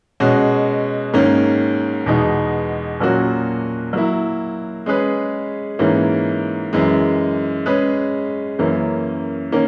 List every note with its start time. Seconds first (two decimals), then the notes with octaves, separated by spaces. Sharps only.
0.20 B2 G#3 C#4 F#4
1.13 G#2 D#3 A#3 C#4
2.06 E2 B2 G#3 D#4
3.00 A#2 F#3 A#3 C#4 F#4
3.93 F#3 A#3 E4
4.86 G#3 C#4 G#4 B4
5.79 G#2 E3 A#3 C#4
6.73 F#2 E3 G#3
7.66 G#3 C#4 G#4 B4
8.59 F#2 E3 A#3 C#4
9.52 D#3 A#3 C#4